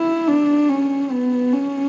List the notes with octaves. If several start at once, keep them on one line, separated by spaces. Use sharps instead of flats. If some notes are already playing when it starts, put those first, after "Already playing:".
Already playing: E4
D4
C#4
B3
C#4